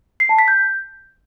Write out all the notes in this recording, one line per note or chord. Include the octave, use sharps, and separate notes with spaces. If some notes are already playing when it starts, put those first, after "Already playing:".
C7
A5
B6
G6